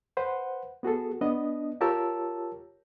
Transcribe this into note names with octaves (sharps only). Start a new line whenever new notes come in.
B4 C5 F#5
B3 F#4 G#4 A4
B3 D4 D#5
F4 G4 A#4 C#5 A5 E6